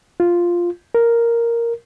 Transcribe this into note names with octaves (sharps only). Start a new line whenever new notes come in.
F4
A#4